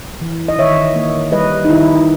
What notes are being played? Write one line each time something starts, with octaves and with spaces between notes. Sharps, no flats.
E3
D#5
D#3 C#5 E5
A#3
G3 B4 D#5
D#4
D#3 E4